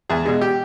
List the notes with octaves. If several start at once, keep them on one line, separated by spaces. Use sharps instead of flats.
E2 G#4
B2 G#3
G4